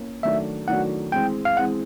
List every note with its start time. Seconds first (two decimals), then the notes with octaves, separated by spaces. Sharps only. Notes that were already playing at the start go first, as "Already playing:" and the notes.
Already playing: A#3 C#4
0.23 D#3 F#3 A3 D4 F#4 E5
0.68 D#3 F#3 A3 D4 F#4 F#5
1.12 E3 G#3 C4 G5
1.45 F5
1.57 E3 G#3 C4 F#5